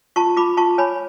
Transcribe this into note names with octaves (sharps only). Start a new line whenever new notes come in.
F4 A5 C#6
F4 B5 D6
F4 A5 C#6
C#5 G#5 B5